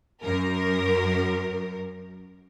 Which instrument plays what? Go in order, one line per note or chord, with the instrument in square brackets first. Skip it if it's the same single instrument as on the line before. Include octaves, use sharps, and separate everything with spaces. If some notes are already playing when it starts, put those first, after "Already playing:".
[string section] F#2 A#4